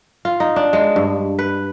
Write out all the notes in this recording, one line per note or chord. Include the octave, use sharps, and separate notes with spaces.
F4
D#4
D4
G#3
G2
B4